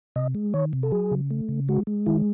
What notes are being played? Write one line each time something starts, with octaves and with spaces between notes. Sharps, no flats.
C3 D#5
G#3
D#3 C#5
C3
A4
F#3 G#4
C#3
A3
C#3
G#3 F#4
G#3
D#3 E4